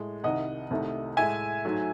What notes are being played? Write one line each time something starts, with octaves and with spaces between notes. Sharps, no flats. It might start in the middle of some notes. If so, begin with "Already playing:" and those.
Already playing: A2 G#3
C2 C3 D#3 D#5 F#5
C2 C3 D#3 A3
A2 G#3 E5 G#5
G#2 F#3 A3